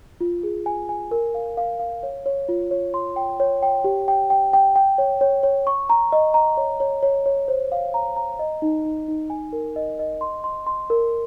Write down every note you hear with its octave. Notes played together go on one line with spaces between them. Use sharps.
F4
G#4
G#5
G#5
A#4
F5
F5
F5
C#5
C#5
F4
C#5
C6
G5
C#5
G5
G4
G5
G5
G5
G5
C#5
C#5
C#5
C#6
A#5
D#5
A#5
C#5
C#5
C#5
C#5
C5
F5
A#5
A#5
D#5
D#4
D#4
D#4
G#5
A#4
D#5
D#5
C6
C6
C6
A#4